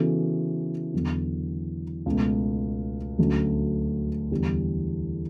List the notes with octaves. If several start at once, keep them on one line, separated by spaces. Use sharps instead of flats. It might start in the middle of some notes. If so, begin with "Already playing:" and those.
Already playing: C#3 E3 B3 F#4 A4
E2 D3 F#3
C#2 B2 A3
D2 D3 F#3 C#4
E2 D3 G3